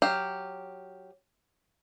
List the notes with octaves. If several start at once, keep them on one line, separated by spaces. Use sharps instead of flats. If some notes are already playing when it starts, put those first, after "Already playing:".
F#3 G4 F5